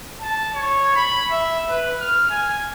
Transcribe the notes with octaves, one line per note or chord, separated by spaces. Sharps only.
A5
C#5
B5
E5
B4
F6
G#5